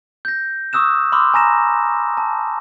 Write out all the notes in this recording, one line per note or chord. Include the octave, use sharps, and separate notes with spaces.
G6 A#6
C#6 D#6 E6 F#6 E7
B5 C6 D6 E6 F6
G#5 A#5 A#6 E7
A5